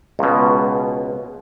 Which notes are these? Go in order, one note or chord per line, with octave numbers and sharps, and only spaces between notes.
C#2 B2